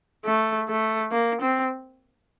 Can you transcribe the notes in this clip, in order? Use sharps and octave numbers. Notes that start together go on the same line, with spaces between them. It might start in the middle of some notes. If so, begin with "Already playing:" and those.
A3
A3
A#3
C4